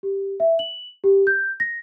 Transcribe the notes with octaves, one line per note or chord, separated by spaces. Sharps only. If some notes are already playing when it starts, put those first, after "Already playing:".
G4
E5
F#7
G4
G6
A#6